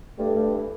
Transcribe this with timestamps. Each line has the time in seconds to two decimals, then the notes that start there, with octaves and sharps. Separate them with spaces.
0.19 G2 A3
0.36 G2
0.54 E3